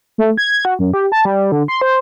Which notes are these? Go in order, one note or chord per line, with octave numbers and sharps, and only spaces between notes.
A3
G#6
F#4
F#2
G4
A5
G3
D3
C6
C5